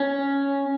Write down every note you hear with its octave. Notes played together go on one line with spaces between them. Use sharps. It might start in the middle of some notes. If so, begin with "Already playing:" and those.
Already playing: C#4